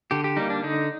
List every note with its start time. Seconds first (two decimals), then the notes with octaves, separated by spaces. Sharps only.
0.11 D3 G4
0.24 G4
0.37 G3 A#3 D#4
0.50 D4
0.63 D3 D#4